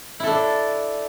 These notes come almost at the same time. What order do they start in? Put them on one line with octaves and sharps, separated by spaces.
E4 A4 D4